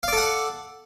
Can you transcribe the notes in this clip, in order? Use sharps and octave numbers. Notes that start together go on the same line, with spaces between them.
A4 D5 F5 F#5